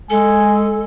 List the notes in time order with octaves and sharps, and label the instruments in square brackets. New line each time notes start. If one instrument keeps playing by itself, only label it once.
[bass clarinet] G#3 [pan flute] A4 [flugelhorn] G#5